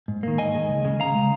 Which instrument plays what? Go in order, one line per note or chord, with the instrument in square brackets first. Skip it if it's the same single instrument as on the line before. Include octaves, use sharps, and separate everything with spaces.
[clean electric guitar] G#2
D#3 A#3
D#2 D#5 G#5
D#3 G#3
C#2
C#3 G#3
C#2 F5 A#5
C#3 G#3